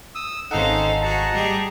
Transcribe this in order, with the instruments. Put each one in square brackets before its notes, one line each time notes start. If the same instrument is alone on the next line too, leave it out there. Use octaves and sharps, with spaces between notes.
[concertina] D#6 E6
[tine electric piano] G#1 F#5 [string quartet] C#4 C5 F5 [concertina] D#4 A4 [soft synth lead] D#5
[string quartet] F#4 G#4 [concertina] A5 A#5
[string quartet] G3 G4 G#4